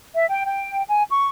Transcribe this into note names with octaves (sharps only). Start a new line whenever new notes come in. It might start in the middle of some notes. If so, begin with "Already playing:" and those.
E5
G5
G5
G#5
C#6